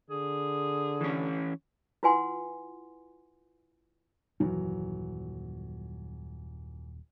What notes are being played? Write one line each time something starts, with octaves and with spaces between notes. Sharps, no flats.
D3 G#4
E3 C#4
E4 F4 B4 F#5 G#5 C6
D#1 F#2 E3 F#3